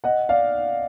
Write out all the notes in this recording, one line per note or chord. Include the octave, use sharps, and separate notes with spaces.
D#5 F#5
D5 F5